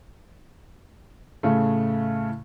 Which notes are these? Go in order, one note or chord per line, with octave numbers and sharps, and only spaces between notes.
A2 C#3 A3